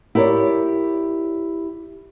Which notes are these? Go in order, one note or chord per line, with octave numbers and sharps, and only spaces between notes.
E4 G4 A#4 C#5 D5